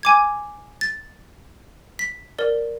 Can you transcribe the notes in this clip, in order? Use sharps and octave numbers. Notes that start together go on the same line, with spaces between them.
G#5 D6 G#6
A6
B6
A#4 D5